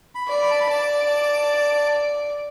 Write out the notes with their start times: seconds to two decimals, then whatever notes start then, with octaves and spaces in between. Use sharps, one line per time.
0.15 B5
0.28 D5
0.42 B5
0.51 A5
0.60 B5
0.70 D5 A5